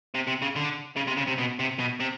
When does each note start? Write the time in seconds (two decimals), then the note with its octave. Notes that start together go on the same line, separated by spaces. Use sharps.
0.14 C3
0.27 C3
0.42 C#3
0.56 D3
0.96 C#3
1.07 C3
1.17 C#3
1.27 C3
1.38 B2
1.59 C3
1.79 B2
2.00 C3